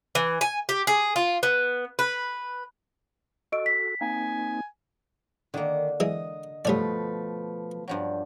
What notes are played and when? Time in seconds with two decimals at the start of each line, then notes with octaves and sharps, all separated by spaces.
0.15 E3
0.41 G#5
0.69 G4
0.87 G#4
1.16 F4
1.43 B3
1.99 B4
3.52 F#4 A4 D#5 D7
3.66 B6
4.01 A#3 C4 D#4 G#5
5.54 D3 D#3 A#3 A#4
6.00 E3 G#3 D#5
6.65 G2 B2 F3 A3 B4 C#5 D5
7.88 G2 F3 F#3